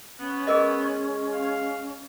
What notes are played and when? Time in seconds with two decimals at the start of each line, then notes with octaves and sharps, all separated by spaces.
0.19 B3 C#4
0.47 G#3 G#4 A#4 D#5
1.33 F5